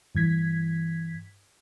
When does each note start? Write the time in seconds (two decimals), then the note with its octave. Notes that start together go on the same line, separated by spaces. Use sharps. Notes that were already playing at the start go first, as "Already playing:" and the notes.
0.15 G2 E3 G#6 B6